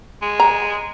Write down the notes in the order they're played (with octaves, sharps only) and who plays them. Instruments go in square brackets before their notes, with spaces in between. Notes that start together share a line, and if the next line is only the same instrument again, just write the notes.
[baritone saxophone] G#3
[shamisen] A#5